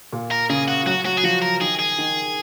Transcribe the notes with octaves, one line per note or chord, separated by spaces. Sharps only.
A#2
A#4
C#3 G#4
F#4
F#3 F#4
F#3 F#4
G#4
F3 F#4
A#4
D#3 G#4
G#4
D#3